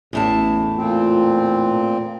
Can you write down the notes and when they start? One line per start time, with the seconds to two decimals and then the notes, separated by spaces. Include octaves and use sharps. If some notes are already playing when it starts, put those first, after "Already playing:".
0.13 A1 E2 A2 A5
0.78 A#2 A3 C4 F4